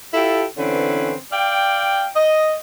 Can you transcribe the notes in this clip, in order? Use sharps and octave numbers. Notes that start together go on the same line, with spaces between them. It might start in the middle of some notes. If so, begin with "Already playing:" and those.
E4 F4 G4 A4
D3 E3 C4 C#4 B4
D5 F5 G5
D#5